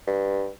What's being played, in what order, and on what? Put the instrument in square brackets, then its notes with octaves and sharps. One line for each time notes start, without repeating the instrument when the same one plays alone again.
[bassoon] G2